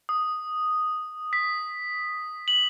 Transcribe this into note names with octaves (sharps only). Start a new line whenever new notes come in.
D#6
B6
F#7